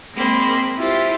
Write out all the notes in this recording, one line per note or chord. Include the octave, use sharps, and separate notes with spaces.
G#3 A#3 C4 B5
E4 F4 G4 C5